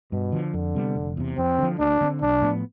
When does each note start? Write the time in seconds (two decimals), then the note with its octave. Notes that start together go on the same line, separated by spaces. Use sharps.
0.12 G2 B2
0.32 D3 F3
0.53 F2 D3
0.75 C3 G3 B3
0.96 F1
1.17 E2 C3
1.38 F2 C4
1.58 D3 F3
1.79 D2 D4
2.01 D3 A3 C4
2.21 B1 D4
2.42 A2 F3 B3